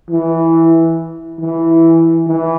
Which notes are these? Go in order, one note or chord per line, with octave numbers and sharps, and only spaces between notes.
E3
E3
E3